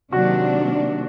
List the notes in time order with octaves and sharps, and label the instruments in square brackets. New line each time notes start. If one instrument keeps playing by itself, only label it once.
[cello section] C3 D#3 F#3 A#3 D4 [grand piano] F#4